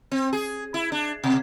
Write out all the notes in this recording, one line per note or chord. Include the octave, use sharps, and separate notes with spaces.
C4
G#4
E4
D4
B2